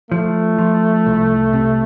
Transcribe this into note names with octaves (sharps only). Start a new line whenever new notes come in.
F3 A3
F3
C2
C3